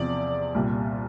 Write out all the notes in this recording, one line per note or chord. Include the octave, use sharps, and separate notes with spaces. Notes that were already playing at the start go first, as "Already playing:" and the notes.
Already playing: E2 C3 F3 D5
C2 A#2 G3